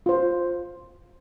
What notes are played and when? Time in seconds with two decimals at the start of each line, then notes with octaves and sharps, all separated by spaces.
0.06 F4 C5